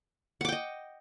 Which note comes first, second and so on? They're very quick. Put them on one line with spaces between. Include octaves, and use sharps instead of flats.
F#5 D6 G5 D#5